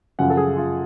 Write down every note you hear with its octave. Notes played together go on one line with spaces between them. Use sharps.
F#2 C#3 F3 F#5
A4
G#4
F4